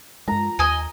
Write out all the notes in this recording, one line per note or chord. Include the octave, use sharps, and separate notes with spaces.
G2 G#3 A#5
D#2 D#5 G#5